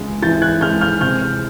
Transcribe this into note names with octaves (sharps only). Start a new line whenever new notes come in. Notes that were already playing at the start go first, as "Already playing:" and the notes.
Already playing: C#2 G#3
E3 G6 A6
F#6 G#6
G#3 F6 G6
F6 G6
C3 F6 G6